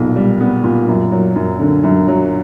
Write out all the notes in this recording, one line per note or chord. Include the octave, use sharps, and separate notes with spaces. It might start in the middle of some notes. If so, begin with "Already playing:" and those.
Already playing: B1 A#2 B3
G3
B3
A#2
F#2
F#3
F#2
D3
F#2
F#3